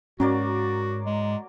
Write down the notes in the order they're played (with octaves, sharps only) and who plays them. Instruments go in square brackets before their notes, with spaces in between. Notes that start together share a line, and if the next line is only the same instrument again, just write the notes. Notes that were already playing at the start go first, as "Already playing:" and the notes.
[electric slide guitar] G#2 [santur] F#3 A#3 D5 [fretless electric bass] C#4 [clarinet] F#4
[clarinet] G#3